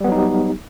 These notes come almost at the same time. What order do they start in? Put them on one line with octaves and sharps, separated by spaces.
G3 B3 F#3 D#4 G4